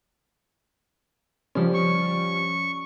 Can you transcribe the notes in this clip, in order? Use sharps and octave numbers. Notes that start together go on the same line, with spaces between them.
F3 G3 C#4
C#6